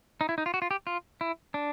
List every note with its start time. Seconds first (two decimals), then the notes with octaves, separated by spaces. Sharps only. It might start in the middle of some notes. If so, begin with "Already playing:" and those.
0.21 D#4
0.29 E4
0.38 D#4
0.46 F4
0.54 F#4
0.62 F4
0.71 G4
0.87 F4
1.21 E4
1.54 D4